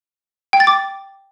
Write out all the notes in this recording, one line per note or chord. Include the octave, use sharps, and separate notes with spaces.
G5
A6
D6